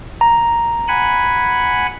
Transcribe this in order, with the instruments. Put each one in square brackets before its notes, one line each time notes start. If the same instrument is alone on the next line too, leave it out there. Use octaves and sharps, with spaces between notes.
[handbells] A#5
[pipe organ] F#5 G#5 B5